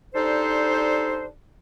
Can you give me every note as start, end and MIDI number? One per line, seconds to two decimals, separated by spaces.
0.14 1.27 55
0.14 1.27 62
0.14 1.27 63
0.14 1.27 69
0.14 1.27 72